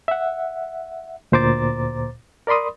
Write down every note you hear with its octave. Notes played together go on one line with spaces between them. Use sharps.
E5 F#5
D2 A#2 C5 A#5 D6 A6
A#4 D5 B5 C6 D#6